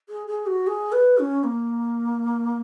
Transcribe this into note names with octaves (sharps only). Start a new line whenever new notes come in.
G#4
G#4
F#4
G#4
B4
C#4
A#3